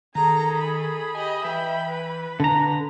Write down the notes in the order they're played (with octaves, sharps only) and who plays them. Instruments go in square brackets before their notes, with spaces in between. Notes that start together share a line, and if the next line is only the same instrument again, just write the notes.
[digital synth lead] D#3 [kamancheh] G#4 A4 [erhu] A#5
[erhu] B5
[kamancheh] G4 D#5 [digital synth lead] G#5
[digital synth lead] E3 [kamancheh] E5 G5
[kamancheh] B4
[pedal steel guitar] D3 A#5 [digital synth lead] A#6